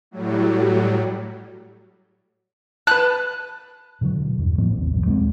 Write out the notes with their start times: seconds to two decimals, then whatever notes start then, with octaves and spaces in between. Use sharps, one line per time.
0.11 A2 F#3 G3
2.87 B4 A5 F#6
4.01 B2 D3 F3 F#3
4.38 E2 G2
4.58 A2 F3 A#3 B3
4.76 D#1 A1 D#2 C3
4.93 F#2 B2
5.05 D#2 G#3 A3 C4